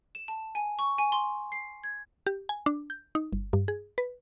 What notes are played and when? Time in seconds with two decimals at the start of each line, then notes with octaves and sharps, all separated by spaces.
0.15 E7
0.28 A5
0.55 G#5
0.79 C#6
0.98 G#5
1.12 C6
1.52 C7
1.84 G#6
2.27 G4
2.49 G#5
2.66 D4
2.90 G6
3.15 D#4
3.33 G1
3.53 G2
3.68 G#4
3.98 B4